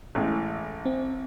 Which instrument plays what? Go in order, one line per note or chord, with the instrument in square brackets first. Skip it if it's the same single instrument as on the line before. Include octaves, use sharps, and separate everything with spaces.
[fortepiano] A1 A2 E3 G#3
[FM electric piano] C4